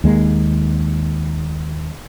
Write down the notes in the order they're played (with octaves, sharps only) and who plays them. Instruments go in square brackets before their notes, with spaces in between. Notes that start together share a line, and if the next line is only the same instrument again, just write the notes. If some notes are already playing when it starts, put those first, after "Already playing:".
[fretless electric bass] D#2 G#3 A#3